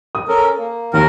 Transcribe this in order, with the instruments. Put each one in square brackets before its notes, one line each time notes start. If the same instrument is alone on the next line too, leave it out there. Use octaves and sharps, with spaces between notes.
[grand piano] D#6
[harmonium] C#4 A4 A#4
A#3
[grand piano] D#2 [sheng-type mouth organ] A#4